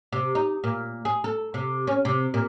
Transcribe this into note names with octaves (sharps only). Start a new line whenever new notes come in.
C3
D#4
A#2
G#4
A4
C3
C#4
C3
A#2